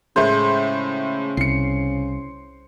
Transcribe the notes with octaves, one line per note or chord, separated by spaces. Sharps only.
A2 C#3 G#3 A3 C5
C2 C7 C#7